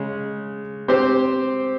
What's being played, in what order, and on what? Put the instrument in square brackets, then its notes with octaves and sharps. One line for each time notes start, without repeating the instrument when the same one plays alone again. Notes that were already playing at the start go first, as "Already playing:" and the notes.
Already playing: [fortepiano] C#3 G#3
C4 G4 C5